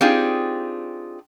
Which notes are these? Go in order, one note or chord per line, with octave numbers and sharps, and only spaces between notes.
C4 D4 D#4 F4 G4 G#4